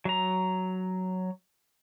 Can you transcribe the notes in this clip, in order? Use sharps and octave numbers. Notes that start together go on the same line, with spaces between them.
F#3 A#5